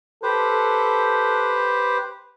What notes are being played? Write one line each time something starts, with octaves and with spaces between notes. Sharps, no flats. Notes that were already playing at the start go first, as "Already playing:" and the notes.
G4 A4 B4 C5